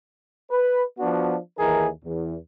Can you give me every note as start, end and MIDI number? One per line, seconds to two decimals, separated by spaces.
0.51 0.82 71
0.99 1.36 53
0.99 1.36 59
0.99 1.36 62
0.99 1.36 66
1.59 1.88 39
1.59 1.88 52
1.59 1.88 63
1.59 1.88 68
1.59 1.88 70
2.05 2.35 40